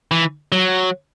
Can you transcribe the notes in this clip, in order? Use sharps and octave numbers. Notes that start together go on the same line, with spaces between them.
E3
F#3